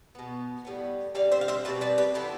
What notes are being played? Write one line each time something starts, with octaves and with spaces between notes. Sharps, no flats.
B2 B3
A2 G3 B3
D3 G3 C4 D5 F5
C5 E5
F5
C5 E5
B2 G3 C4 B4 D5
B4 D5
G4 B4
D3 F3 B3 E4 G4